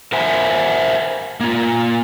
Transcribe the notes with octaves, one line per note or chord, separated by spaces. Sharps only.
A#4 C5 E5 F#5 G#5
A#3 F4